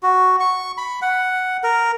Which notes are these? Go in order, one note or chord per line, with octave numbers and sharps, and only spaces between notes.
F#4
C#6
B5
F#5
A#4